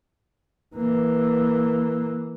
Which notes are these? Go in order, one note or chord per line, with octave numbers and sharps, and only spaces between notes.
E3 A#3